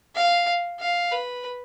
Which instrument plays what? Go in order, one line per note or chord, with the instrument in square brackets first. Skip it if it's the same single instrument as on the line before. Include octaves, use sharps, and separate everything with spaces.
[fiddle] F5
F5
B4